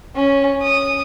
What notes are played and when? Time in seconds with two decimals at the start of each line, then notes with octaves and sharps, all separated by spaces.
0.15 C#4
0.63 D#6